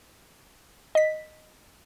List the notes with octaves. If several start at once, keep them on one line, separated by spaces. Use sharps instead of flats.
D#5 B6